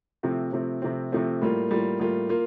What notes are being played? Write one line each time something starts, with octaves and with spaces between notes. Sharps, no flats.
C3 F3 A3 C4
C3 F3 A3 C4
C3 F3 A3 C4
C3 F3 A3 C4
A2 G3 A#3 F4
A2 G3 A#3 F4
A2 G3 A#3 F4
A#3 F4